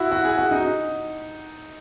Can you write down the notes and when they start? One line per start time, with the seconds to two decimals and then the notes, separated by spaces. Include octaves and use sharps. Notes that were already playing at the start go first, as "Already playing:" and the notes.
Already playing: E4 F#4
0.12 F#4
0.25 G#4
0.38 F#4
0.51 D#4